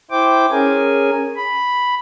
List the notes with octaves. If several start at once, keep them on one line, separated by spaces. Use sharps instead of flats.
E4 C5 G5 D6
C#4 G#4 A#4 G#5
B5